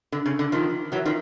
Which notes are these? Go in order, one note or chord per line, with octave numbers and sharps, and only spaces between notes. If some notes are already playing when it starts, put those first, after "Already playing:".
D3
C#3
D3
D#3 F3
E3 F#3
D#3 F3